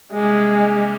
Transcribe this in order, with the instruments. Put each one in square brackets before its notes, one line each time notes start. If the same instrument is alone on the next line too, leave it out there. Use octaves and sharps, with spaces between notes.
[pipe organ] C3 G3 A#3 C#4 [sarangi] G#3